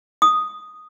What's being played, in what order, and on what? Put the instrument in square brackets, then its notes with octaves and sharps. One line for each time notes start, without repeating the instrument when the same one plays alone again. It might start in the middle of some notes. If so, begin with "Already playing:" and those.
[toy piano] D#6